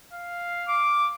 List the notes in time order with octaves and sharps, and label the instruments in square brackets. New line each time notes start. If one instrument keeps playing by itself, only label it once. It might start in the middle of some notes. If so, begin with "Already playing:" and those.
[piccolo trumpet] F5
[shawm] D6